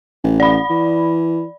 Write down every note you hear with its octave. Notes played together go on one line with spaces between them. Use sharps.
A1
D5 B5
E3